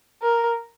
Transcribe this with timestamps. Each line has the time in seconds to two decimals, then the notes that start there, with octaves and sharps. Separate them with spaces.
0.22 A#4